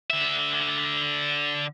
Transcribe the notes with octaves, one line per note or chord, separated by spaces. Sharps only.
D3 E5